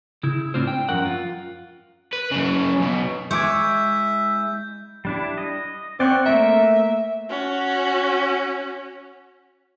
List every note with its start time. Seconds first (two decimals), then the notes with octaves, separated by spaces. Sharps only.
0.23 C#3 E4
0.54 A2 C4 D4 F4 C5
0.67 G5
0.89 F#2 F3 C#4 A#4 F#5
1.05 F4
2.13 B4
2.31 F#2 C#3
2.80 B1 B2
3.31 G#3 E4 E5 C#6 D6 G6 G#6
5.05 G3 D4 E4
5.38 D#5
6.00 C4 D5 F#5 C#6
6.26 A3 A#3 A#4 E5
7.30 C#4 F#4